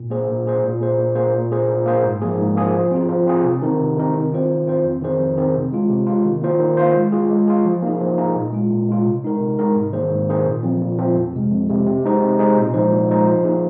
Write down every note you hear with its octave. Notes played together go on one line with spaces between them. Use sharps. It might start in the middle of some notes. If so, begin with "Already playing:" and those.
Already playing: A#2
A#3 G#4 C5
A#2
A#3 G#4 C5
A#2
A#3 G#4 C5
A#2
A#3 G#4 C5
A#2
A#3 G#4 C5
A#2
A#3 G#4 C5
G#2
F3 A#3 G#4
G#2
F3 A#3 G#4
F3
C4 F4 G#4
F3
C4 F4 G#4
C3
D#3 C4 D#4 A#4
C3
D#3 C4 D#4 A#4
D#3
C4 F4 C5
D#3
C4 F4 C5
F2
D#3 C4 G#4 C5
F2
D#3 C4 G#4 C5
C3
G#3 F4
C3
G#3 F4
D#3
A#3 F4 C5
D#3
A#3 F4 C5
G#3
F4 G#4
G#3
F4 G#4
F3
A#3 D#4 G#4
F3
A#3 D#4 G#4
A#2
G#3 F4
A#2
G#3 F4
C3
G#3 D#4 A#4
C3
G#3 D#4 A#4
G#2
D#3 A#3 G#4 C5
G#2
D#3 A#3 G#4 C5
A#2
F3 C4
A#2
F3 C4
F2
C3 G#3
F2
C3 G#3
C3
G#3 D#4 G#4 C5
C3
G#3 D#4 G#4 C5
A#2
F3 G#3 D#4 C5
A#2
F3 G#3 D#4 C5
F3
A#3 D#4 G#4